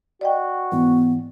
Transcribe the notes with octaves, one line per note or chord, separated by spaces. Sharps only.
F#4 D5 D#5 G5
G#2 E3 B3